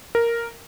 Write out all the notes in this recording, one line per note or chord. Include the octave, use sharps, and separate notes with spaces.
A#4